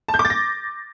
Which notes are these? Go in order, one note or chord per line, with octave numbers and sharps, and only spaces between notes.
A5
G6
D6
A6
A#6